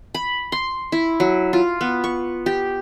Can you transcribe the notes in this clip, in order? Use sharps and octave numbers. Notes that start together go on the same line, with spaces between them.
B5
C6
E4
F#3
F4
B3
C#6
G4